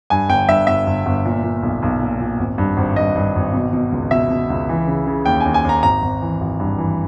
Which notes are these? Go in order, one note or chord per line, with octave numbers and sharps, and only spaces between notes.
G2 G#5
G1 G5
G2 E5
G1 E5
G1
G1
A#2
A#2
B1
B1
A#2
A#2
G#1
G2
G#1
G2 D#5
G2
G#1
B2
B2
C#2
B2 E5
B2
C#2
E3
C#3
C#3
D#2 G5
G#5
D#2
G#5
D#2 A#5
G#1 A#5
G#1
E3
G#1
G2
E3